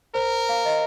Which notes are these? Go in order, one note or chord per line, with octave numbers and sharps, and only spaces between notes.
A#4 C5
F5
D#5